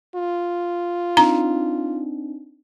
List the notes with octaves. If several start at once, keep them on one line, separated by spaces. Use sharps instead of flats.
F4
C4 D4 D#4 A#5